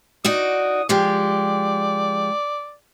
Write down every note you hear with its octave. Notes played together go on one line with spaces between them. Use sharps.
D#4 F#4 D5 D#6
F3 G#3 G4 D5